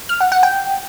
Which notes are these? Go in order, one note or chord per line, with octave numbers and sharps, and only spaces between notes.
F6
F#5
F#5
G5